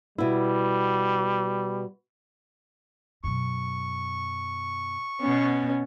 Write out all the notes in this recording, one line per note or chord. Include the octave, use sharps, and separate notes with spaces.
B2 G3 E4
F#2 B2 C#6
B2 B3 C#4